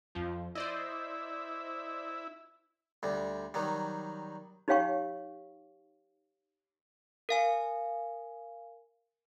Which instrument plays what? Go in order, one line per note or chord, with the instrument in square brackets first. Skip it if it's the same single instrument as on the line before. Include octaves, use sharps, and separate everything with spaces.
[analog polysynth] F2 F3
[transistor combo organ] E4 [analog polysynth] C5 D5 D#5
[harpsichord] D2 G3
D#3 F#3 G3
[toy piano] D#4 G4 C#5 F5 G5 C#6
[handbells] A#4 F5 G#5